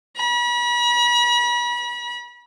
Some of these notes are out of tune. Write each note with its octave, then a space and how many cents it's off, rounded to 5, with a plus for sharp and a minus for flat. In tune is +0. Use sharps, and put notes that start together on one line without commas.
B5 -40